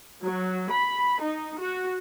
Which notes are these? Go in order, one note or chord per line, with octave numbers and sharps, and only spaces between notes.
F#3
B5
D#4
F#4